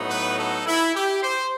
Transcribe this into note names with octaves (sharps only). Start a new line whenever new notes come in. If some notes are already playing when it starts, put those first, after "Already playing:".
Already playing: A2 F#3 B3 D#4
B4
A4
E4
G4
C5